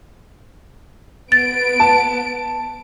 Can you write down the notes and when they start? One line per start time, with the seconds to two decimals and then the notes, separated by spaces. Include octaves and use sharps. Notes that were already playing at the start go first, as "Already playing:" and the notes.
1.32 B3 A6 D7
1.80 A5